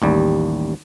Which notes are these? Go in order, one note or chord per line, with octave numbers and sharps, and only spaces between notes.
A1 D#2 G3